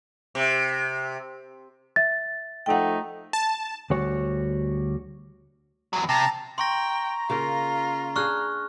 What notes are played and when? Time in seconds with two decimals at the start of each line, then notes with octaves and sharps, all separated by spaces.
0.35 C3
1.96 E5 A6
2.66 F3 A3 D#4 F#5 G5
3.33 A5
3.90 D2 G3 F#4 C#5
5.93 E2 F#3
6.09 C3 A5 A#5
6.58 G5 A#5 C6 C#6 A#6
7.30 C#3 A#3 F4 A#4
8.16 D4 G#4 C#6 F6 F#6